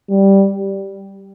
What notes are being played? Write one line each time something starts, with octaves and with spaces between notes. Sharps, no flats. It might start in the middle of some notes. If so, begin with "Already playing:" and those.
G3